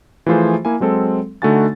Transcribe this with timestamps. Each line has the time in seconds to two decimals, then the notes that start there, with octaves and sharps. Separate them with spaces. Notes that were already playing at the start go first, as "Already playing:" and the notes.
0.26 E3 F3 A3 F4 G#4 C5
0.65 A#3 E4 G#5
0.80 F#3 G#3 C4 A4
1.42 D3 A3 D#4 F#4 G#5 A6